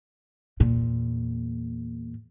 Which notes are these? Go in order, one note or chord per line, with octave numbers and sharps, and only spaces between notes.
E2 A#2